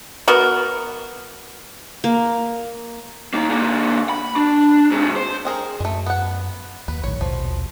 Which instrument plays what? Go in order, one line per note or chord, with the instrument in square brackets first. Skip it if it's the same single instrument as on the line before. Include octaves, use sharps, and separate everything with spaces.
[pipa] B3 F#4 A#4
[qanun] A#3
[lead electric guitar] A#3 D#4
D3 A#3
B5
D4
G#2 C3
C5
[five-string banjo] C4 G#4 A#4
[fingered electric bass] F#2 [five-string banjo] G#3 A3
[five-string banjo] B3 F#5
[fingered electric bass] D#2 [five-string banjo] B4
[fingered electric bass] A#1 A2 D#3 [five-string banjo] C#5
[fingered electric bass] A#1 D#2 B2 [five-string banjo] F3